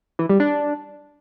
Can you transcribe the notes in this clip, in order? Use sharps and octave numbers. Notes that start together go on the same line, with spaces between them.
E3
G3
D4